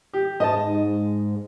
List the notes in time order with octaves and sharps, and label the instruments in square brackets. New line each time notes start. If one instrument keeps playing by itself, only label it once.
[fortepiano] G4
[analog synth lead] G#2 [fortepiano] D#5 A5